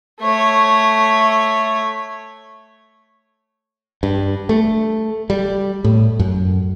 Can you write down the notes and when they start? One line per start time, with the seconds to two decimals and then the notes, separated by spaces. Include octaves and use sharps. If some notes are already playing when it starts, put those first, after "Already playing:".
0.20 A3 C#5
4.03 G2
4.49 A3
5.30 G3
5.84 A2
6.20 F#2